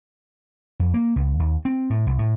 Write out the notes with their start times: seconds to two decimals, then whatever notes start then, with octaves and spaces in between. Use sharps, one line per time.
0.80 F2
0.94 A#3
1.16 C#2
1.39 D#2
1.65 C4
1.90 A2
2.07 C2
2.19 A2